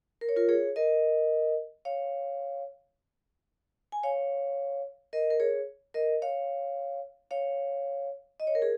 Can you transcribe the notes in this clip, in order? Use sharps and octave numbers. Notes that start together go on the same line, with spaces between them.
A#4
C#5
F4 A#4
G#4 C#5
A#4 D#5
C#5 F5
G#5
C#5 F5
A#4 D#5
A#4
G#4 C#5
A#4 D#5
C#5 F5
C#5 F5
D#5
C#5
A#4
G#4